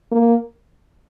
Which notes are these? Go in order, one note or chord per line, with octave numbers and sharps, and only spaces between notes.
A#3